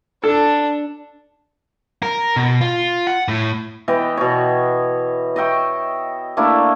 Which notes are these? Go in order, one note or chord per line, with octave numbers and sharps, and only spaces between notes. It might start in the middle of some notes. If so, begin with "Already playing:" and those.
D4 A4
A#4
B2
F4
F#5
A2
E3 B3 D#5 G5
B2 C#5
D#5 E5 G5 C#6
A3 A#3 D4 E4